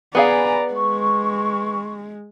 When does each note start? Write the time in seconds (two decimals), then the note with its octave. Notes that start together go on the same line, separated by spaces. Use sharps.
0.15 B3 G#4 D5 F5 G#5 A#5 B5
0.74 G#3 C#6